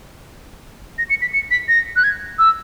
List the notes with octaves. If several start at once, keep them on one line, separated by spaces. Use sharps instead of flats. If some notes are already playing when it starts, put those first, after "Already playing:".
A#6
C#7
B6
C#7
B6
A#6
F#6
G#6
E6